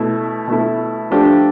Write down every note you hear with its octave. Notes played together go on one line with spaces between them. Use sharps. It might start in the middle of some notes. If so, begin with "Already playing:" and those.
Already playing: B2 A3 E4
B2 A3 E4
F3 A3 D4 G4 C5